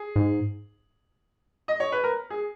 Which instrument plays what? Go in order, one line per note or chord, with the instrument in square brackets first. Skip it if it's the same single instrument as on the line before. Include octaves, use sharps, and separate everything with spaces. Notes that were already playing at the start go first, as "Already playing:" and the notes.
Already playing: [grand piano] G#4
[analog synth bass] G#2
[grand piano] D#5
C#5
B4
A#4
G#4